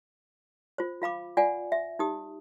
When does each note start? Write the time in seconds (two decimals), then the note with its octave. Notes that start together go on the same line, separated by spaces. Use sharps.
0.78 F4 C5
1.02 F4 F5 B5 D6
1.37 F4 D5 F#5 G#5
1.72 E5
1.99 D#4 G4 D#6